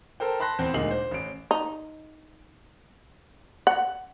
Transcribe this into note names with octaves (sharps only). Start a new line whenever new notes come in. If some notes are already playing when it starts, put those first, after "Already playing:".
A4 A#4 C5 G5
A5 B5 C6 F#6 A#6
E2 C4 C5
D2 A#2 G#3 D#4 C7 F#7
C5
A1 D7
D#4
F#5